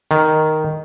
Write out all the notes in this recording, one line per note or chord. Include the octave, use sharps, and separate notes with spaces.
D#3